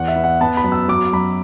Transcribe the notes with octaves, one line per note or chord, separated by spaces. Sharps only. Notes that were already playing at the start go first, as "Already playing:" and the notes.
Already playing: E2 F#5
E5
B3
F#5
B3 A5
B5
F#2
E6
F#3 D6
F#2 B5